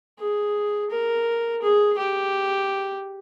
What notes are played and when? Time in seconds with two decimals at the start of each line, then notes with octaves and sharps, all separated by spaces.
0.19 G#4
0.91 A#4
1.63 G#4
1.98 G4